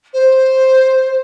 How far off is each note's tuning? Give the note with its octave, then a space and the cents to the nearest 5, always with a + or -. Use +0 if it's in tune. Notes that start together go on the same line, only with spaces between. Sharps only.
C5 +5